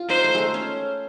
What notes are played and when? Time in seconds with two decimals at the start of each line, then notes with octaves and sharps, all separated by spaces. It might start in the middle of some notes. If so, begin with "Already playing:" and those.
Already playing: F4
0.09 D#4 C5
0.24 A3
0.35 G#3 A3
0.54 C#4